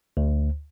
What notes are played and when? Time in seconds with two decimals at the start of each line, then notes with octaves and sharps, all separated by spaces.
0.17 D2